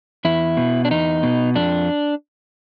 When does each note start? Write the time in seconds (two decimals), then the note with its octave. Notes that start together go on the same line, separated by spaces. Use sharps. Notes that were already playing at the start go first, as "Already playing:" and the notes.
0.25 E2 E4
0.57 B2
0.85 D4
0.91 E2 D#4
1.23 B2
1.55 F2 D4